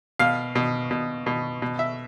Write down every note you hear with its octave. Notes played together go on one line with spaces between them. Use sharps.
B2 F5
B2
B2
B2
B2
E5